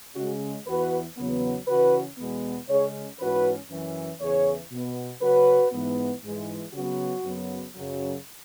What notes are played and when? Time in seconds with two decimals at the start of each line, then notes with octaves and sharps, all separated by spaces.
0.15 C#3 G#3 C#4 F#4
0.67 E2 E3 B3 F#4 B4
1.17 E2 C#3 F#3 B3
1.67 C#3 E3 C#4 F#4 B4
2.18 E2 B2 G#3 B3
2.68 C#3 G#3 C#4 G#4 C#5
3.20 G#2 E3 C#4 F#4 B4
3.70 F#2 E3 C#4
4.20 E2 C#3 E3 G#4 C#5
4.71 B2 B3
5.22 C#3 F#3 C#4 F#4 B4
5.73 G#2 E3 B3
6.23 G#2 E3 G#3
6.73 C#3 F#3 B3 F#4
7.24 F#2 C#3 F#3 B3
7.75 F#2 C#3 F#3